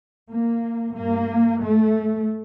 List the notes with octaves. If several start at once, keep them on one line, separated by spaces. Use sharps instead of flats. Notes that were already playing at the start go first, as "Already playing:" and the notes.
A#3
G2 A#3
A3